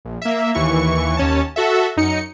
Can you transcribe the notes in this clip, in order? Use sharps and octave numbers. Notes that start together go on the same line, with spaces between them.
A#1
A#3 E5
D#2 E3 C#6
D#2 C#4 A5
F#4 A4 E5
F#2 D#4 C#7